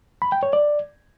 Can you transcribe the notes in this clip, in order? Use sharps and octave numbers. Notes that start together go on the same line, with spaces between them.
B5
G5
C#5
D5